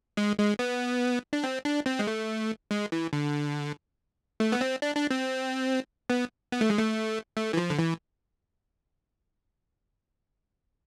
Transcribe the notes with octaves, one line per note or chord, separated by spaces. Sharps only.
G#3
G#3
B3
D4
C4
D4
C4
G#3
A3
G#3
E3
D3
A3
B3
C4
D4
D4
C4
B3
B3
A3
G#3
A3
A3
E3
F3
D3
E3